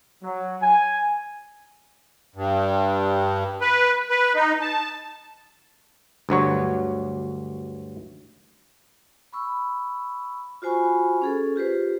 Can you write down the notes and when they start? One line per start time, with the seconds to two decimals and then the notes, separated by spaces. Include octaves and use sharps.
0.23 F#3
0.62 G#5
2.35 G2
3.61 B4
4.09 B4
4.35 D#4
4.61 A5
6.29 D2 G2 F#3 C#5
9.33 B5 C#6 E6
10.62 F4 F#4 C5 G#5 B5 C#6
11.22 C#4 G#4 A4
11.56 F4 G4 B4 C5